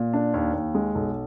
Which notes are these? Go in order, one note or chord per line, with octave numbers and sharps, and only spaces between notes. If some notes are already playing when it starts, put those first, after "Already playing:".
Already playing: A#2
D4
D#2
D#2
G#3
B1